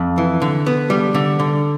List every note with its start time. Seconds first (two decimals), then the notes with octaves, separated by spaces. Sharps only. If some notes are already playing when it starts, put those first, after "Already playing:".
Already playing: F2
0.18 E3
0.42 D3
0.66 B3
0.90 G3
1.15 D3
1.40 D3